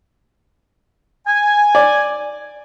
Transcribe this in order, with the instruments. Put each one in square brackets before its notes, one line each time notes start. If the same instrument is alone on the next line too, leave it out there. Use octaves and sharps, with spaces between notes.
[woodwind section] G#5
[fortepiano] D5